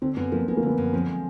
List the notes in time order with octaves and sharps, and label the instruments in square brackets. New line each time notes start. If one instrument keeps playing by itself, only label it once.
[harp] D3 [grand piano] C4
[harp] F#2 [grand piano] B3
[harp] F3 [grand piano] A#3
[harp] G#3 [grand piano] B3
[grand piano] A#3
[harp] D3 [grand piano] B3
[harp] F#2
[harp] F3 [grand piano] C4
[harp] G#3